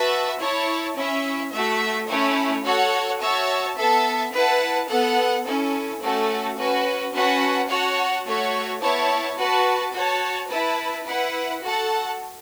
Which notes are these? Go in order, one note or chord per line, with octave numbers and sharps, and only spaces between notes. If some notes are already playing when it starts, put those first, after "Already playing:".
Already playing: F#4 B4 E5 A5
E4 C#5 A5
C#4 E4 C#5 E5
A3 F#4 A4 E5
A3 C#4 E4 C#5
F#4 A4 C#5 F#5
F#4 C#5 E5 A5
B3 A4 E5 A5
E4 B4 F#5 A5
B3 A4 F#5
C#4 E4 A4
A3 C#4 F#4 A4
C#4 F#4 B4
C#4 F#4 B4 F#5 A5
F#4 C#5 F#5 A5
A3 F#4 A4 C#5
B3 E4 C#5 A5
F#4 B4 A5
F#4 C#5 A5
E4 B4 A5
E4 B4 F#5
F#4 A4 F#5 A5